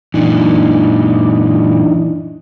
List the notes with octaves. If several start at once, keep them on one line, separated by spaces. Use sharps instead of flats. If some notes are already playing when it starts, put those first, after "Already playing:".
F#2 A#2 E3 D4 D#4